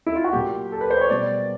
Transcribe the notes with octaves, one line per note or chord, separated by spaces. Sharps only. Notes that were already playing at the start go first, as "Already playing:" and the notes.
E4
F4
F#4
A#2 F#3 A#3 G4
A4
B4
C5
C#5
B2 G3 A#3 D5